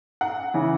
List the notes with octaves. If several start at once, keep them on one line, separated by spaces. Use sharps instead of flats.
F#5
C#3 E3